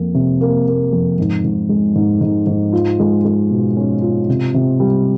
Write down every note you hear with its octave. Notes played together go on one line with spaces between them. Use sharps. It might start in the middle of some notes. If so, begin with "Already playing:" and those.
Already playing: F2 A#3
C3
A#3
A#3
F2
G#2
G#2
G#3
G#2
G#2
G#2
F4
G#3
G#3
B2
C#4
F4
C3
C3
G3